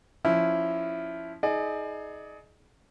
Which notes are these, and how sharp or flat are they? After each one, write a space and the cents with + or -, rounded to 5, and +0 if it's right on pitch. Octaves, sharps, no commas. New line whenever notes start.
F3 +0 C#4 +5 E4 +5
D#4 +30 G#4 +30 D5 +40